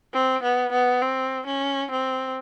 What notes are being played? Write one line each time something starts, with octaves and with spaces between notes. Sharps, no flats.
C4
B3
B3
C4
C#4
C4